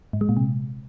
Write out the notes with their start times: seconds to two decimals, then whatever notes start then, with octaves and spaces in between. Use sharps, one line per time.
0.13 G#2
0.21 G#3
0.29 A#2
0.37 C3